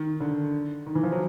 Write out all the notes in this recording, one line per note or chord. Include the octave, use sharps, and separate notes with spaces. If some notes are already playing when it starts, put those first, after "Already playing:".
Already playing: D#3
D3
D#3
E3
F3
F#3